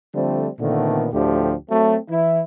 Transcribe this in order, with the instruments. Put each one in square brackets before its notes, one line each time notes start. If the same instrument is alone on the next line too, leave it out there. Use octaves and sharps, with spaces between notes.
[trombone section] D3 F3 G3 A3 C4
A#2 D3 D#3 A3 B3 C4
D2 A2 D3 F3 G4
F#3 A3 C4
E3 E4